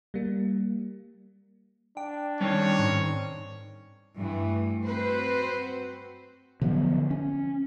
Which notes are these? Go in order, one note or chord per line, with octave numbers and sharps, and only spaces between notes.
G3 A#3
D4 G5
D#3 G3 C4 C#4 C#5
G#2
G2 E3 A3
C4 F#4 B4 C5
D3 F3 F#3 B3
C#4